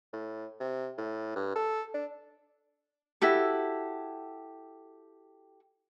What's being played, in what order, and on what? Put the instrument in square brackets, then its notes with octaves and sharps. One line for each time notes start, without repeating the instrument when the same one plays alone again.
[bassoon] A2
C3
A2
G2
A4
D4
[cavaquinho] E4 F#4 G4 A4